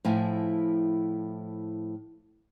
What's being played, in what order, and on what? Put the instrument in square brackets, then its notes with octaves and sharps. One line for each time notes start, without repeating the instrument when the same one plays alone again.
[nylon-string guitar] A2 F3 E4 G#5